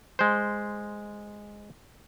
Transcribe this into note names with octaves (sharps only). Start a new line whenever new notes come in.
G#3 C5